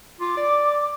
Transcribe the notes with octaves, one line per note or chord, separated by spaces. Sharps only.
F4 D6
D5